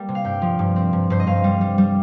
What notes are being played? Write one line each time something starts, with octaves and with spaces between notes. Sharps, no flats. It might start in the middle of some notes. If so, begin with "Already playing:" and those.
Already playing: G3 A#3
C3
F5
G2 G5
F3
G2
C4
G2
G2 C5
D#5
G2 F5
G3
G3
G3